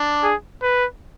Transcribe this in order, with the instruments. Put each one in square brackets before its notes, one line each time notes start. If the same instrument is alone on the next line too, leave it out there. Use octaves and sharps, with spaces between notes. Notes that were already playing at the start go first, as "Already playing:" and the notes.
Already playing: [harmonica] D4
[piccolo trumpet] G#4
B4